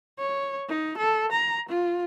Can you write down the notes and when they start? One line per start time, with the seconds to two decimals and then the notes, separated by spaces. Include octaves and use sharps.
0.19 C#5
0.69 D#4
0.98 A4
1.32 A#5
1.69 F4